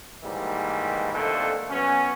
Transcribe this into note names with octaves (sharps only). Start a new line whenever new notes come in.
G#2 D#3 E3 G3 A#3
F2 A#2 D3 D#3 A3
F#3 B3 C#4